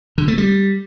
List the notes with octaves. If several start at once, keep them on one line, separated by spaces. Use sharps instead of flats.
D3
A3
G3